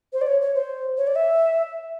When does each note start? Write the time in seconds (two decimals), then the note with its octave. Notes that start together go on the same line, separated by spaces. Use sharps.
0.13 C5
0.21 D5
0.27 C#5
0.41 C#5
0.55 C5
0.97 C#5
1.07 D5
1.16 E5